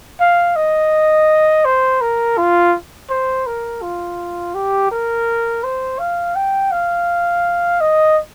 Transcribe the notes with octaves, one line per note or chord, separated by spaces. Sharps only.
F5
D#5
C5
A#4
F4
C5
A#4
F4
G4
A#4
C5
F5
G5
F5
D#5